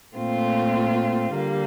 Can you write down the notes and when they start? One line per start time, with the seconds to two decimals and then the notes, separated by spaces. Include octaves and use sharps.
0.16 A#2 A3 C4 F4
1.32 D3 G3 A#3